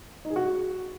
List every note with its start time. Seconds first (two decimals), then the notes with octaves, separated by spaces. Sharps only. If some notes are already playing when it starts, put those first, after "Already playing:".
0.25 D#4
0.30 G#4
0.36 F#4